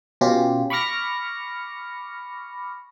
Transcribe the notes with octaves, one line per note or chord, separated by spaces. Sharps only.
B2 C#4 F4 G4
B5 C#6 D6 F6 A#6 C#7